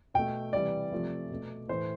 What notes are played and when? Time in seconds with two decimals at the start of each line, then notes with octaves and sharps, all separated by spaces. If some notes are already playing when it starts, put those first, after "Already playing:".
0.14 B2 A3 G5
0.53 C3 E3 G3 D5
0.92 C3 F3 A3
1.30 B2 A3
1.68 A2 E3 A3 C5